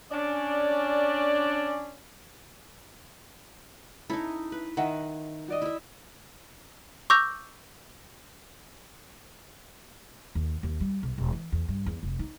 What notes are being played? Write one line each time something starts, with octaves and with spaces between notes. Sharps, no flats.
C#4 D4 D5
C#4 D#4 E4 A4 E5
B4
D#3 D#5 E5 F#5
F#4 D5 D#5
E4 E5
C#6 D6 E6 G6 A#6 F7
D#2
D#2
G3
B1
E1
E3
E2
G2
E2
F1
D#4